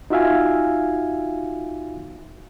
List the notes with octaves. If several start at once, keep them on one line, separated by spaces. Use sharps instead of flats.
D#4 F4 F#4 E5 F5 G#5